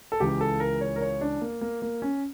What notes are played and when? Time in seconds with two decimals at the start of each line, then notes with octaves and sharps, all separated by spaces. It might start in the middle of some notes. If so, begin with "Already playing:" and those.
0.12 A4
0.20 C#2 C#3 E3 G4
0.41 A4
0.60 A#4
0.81 C#5
0.96 A#4
1.01 C#5
1.21 D4
1.41 A#3
1.61 A#3
1.82 A#3
2.02 C#4